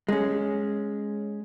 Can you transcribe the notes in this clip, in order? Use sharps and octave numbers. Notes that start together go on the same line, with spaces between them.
G#3 C#4